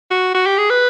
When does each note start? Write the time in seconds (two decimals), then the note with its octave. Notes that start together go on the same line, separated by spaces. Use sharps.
0.11 F#4
0.35 F#4
0.46 G4
0.58 G#4
0.70 B4